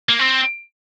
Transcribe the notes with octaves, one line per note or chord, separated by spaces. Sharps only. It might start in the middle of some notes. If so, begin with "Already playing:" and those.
A#3
C4